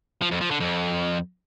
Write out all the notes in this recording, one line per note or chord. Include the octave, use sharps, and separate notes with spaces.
F3
F2
F3
D3
F2